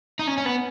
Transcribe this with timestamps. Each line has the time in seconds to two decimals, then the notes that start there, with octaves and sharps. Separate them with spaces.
0.19 D#4
0.27 C#4
0.38 C#4
0.46 B3